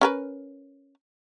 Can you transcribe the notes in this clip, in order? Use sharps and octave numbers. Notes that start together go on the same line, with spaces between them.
C#4 A#4 B4